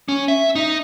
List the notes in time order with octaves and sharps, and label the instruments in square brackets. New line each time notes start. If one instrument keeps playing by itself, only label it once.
[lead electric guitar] C#4
E5
D#4